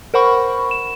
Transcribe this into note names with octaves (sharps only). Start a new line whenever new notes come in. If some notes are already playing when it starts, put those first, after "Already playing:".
A#4 C5 F#5 B5 C#6
E7